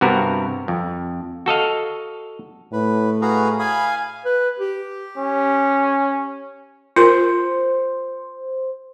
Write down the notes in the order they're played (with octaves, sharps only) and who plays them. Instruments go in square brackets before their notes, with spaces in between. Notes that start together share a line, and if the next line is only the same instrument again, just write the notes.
[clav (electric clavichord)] G2 C3 B3 F#4 A#4
F2
F#4 A4 D#5 F5
[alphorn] A2 [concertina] B4
[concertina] F#4 G#4 B4 [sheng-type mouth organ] F5 A#5
[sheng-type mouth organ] F5 G#5 [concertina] B5 D#6
[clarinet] B4
G4
[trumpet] C#4
[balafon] F4 A#4 [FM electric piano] C5